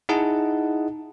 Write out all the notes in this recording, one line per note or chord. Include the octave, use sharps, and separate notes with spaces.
D#4 E4 G#4 D#5 F#5 A5